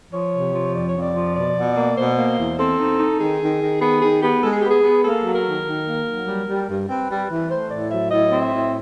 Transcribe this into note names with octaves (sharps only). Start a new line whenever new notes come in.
F3 C#5
C3
F3
F2 D5
C#5
F2
D5
F3
B2 D5
B2
A#3
B2 C5
A#3
E2
C4 A4
D#4
D#4
D#3 G#4
D#3
D#3
B3 G#4
D#3 G#4
B3 G4
G#3 A4
G#4
B3 G4
G#4
B3
A#3 A4
F#3
A#4
D#3
D#3
A#3
F#3
G3
G3
G2
C4 B4
G3
E3
A3 C5
A2 D5
F#3 E5
A2 D#5
C4
E5
A2